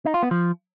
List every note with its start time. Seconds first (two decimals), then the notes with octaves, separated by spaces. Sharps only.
0.05 D#4
0.14 F4
0.23 B3
0.31 F3